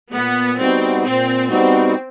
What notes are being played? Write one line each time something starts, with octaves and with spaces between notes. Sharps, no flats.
A#2 B3
G3 B3 C4 D#4 F#4
A#2 C4
G3 B3 C4 D#4 F#4